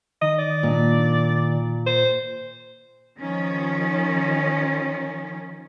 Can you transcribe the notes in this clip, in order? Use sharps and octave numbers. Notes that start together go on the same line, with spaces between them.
D#3 D#5
D5
A#2 D4
C5
D#3 F3 C#4